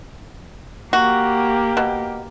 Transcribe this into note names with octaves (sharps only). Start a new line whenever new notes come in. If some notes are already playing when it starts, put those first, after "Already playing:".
A#3 F#4 G4
B2